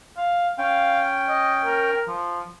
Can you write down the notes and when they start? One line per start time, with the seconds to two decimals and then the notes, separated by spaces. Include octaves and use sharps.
0.17 F5
0.58 C#4 F5 G5
1.28 D#5
1.65 A#4
2.08 F3